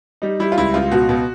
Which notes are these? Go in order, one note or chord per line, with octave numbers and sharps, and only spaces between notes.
G3 D#4
G3 E4
F4
C#2 E4
C#2 F4
B2 F#4
B2